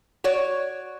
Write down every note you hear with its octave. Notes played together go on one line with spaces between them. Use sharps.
F#4 C#5 D5